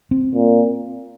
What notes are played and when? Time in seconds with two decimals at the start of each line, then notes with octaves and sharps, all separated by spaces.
0.11 C4
0.35 A#2